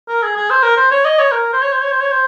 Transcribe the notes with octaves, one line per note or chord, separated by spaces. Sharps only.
A#4
G#4
G#4
C5
A#4
C5
C#5
D#5
C#5
A#4
C5
C#5
C5
C#5
C5
C#5
C5